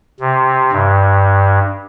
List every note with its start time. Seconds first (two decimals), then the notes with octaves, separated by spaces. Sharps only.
0.20 C3
0.72 G2